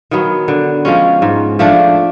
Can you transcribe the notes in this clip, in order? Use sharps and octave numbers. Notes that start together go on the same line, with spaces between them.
D#3 F#3 B3
D3
F3 G#3 C#4
G#2
F3 A3 D4